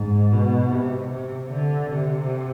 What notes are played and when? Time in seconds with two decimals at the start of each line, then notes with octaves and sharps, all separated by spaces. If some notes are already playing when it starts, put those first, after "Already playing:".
Already playing: G#2
0.32 B2
0.72 C3
1.11 C3
1.51 D3
1.91 C3